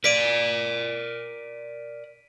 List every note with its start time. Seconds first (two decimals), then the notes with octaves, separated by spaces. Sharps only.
0.04 A#4 D5 B6 D7 D#7